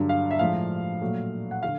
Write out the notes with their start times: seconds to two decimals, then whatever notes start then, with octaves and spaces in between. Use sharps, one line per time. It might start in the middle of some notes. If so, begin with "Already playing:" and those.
Already playing: G2 D3 F#3
0.09 F5
0.31 E5
0.39 A2 F3 G#3 F5
1.01 A#2 F#3 A3
1.51 F#5
1.63 D3 F5